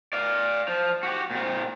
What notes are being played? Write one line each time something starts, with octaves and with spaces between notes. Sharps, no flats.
D5 F5
F3
F#4 G4
A#2 C4